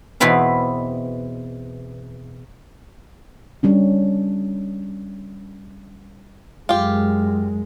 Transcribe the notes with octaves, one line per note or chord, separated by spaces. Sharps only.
E2 B2 C4 E4 B4 F5
G3 C#4 D4
F#2 G#3 F4 G4